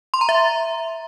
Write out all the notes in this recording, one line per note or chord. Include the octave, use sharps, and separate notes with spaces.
C6
A#5
E5